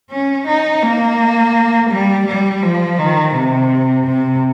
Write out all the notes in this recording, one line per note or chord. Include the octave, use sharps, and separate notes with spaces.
C#4
D#4
A#3
G3
G3
F3
D#3
C3
C3